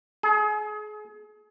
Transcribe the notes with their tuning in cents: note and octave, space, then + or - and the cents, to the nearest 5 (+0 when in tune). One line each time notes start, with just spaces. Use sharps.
G#4 +35